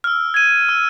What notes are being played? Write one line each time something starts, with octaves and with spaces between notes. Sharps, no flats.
E6 F6
G#6 D#7
E6